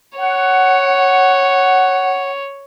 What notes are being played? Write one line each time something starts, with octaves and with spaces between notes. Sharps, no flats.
C#5 F#5